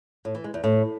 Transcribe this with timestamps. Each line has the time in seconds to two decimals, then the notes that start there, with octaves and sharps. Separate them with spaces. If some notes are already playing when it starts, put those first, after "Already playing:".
0.25 A2
0.35 E3
0.44 G#3
0.54 E2
0.64 A2